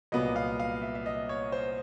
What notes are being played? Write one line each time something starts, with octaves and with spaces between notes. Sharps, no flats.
C2 A#2 F#3 B3 D#5
F5
F5
E5
E5
D#5
C#5
C5